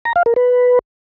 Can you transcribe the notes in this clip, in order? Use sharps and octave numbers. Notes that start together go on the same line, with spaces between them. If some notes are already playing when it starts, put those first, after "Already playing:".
A#5
F5
A#4
B4